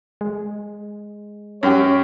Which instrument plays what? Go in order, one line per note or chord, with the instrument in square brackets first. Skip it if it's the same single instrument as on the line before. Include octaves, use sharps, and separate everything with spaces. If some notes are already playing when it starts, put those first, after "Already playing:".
[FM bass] G#3
[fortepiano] F#2 G4 [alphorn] C#5